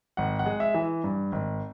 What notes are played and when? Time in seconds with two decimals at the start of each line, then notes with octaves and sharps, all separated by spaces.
0.17 G#1 F#5
0.39 F#5
0.46 G#3
0.60 E5
0.74 E3
1.04 G2
1.32 G#1